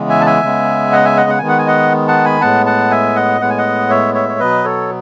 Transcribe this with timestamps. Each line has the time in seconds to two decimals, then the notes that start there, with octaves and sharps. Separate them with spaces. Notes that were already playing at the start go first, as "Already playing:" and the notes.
Already playing: C#3 E3 G#3 B3
0.09 E5 G#5
0.21 A5
0.26 E5 G#5
0.42 C#3 G#3 B3
0.92 D#5 F#5
1.05 E5 G#5
1.17 D#5 F#5
1.29 F#5
1.38 D#3 G#3 B3 G#5
1.49 F#5
1.58 G#5
1.67 D#5 F#5
2.08 F#5 A5
2.25 G#5 B5
2.41 A2 G#3 B3 F#5 A5
2.66 F#5 A5
2.91 E5 G#5
3.15 D#5 F#5
3.41 A2 G#3 B3 F#5
3.50 G#5
3.58 D#5 F#5
3.90 C#5 E5
4.14 C#5 E5
4.29 C#5
4.39 B2 F#3 B3 B4 D#5
4.64 A4 C#5